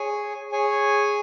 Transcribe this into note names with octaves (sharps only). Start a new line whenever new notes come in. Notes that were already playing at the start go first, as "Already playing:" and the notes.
Already playing: G#4 C#5 G#5
G#4 C#5 G#5